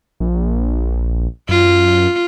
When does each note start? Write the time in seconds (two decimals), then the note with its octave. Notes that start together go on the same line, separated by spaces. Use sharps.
0.20 A#1
1.49 F#2 F4